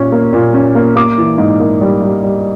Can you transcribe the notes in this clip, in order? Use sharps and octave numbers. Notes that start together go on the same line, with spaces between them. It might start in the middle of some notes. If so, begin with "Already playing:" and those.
Already playing: A#2 C#4
A#3
A#2
C#4
A#3
A#3 D6
E3
G#2
A#3
G3
G3
G3